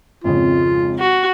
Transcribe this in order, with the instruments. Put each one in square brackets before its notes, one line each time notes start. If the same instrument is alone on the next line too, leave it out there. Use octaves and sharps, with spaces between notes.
[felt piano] G#1 F2 C#3 [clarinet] F4
[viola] F#4